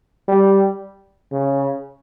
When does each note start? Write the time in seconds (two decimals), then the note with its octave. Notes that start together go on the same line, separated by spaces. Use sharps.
0.28 G3
1.32 C#3